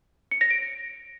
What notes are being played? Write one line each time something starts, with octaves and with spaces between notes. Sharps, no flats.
C#7
A#6
D7